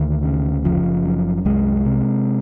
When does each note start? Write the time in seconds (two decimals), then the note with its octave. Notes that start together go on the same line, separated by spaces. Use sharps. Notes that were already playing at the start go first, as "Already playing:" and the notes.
Already playing: D2 D#3
0.24 C#3
0.65 F#1 F3
1.05 F#2
1.45 C2 G#3
1.86 C3